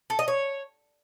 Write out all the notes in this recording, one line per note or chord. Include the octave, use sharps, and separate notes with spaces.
A4
D#5
C#5